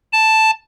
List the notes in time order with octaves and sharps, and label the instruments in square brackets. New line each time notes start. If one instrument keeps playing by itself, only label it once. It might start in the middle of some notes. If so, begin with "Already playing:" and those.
[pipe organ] A5